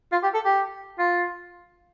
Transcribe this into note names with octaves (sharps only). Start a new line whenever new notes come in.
F4
G4
A4
G4
F4